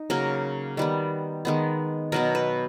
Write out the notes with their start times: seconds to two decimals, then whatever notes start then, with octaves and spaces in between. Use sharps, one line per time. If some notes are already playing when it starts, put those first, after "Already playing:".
Already playing: D#4
0.10 C#3 F#3 A#3 A#4
0.77 D#3 G3 B3
1.45 D#3 G#3 B3
2.12 B2 F#3 B3 A#4
2.35 B4